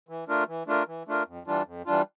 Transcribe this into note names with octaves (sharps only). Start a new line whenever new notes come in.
E3
A3 D4 F4 A#4
E3
A3 D4 F4 A#4
E3
A3 D4 F4 A#4
F2
E3 G3 D4 F4
F2
E3 G3 D4 F4